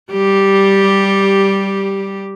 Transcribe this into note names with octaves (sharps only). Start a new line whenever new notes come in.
G3 G4